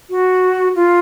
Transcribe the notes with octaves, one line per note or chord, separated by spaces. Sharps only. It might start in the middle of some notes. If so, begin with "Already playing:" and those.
F#4
F4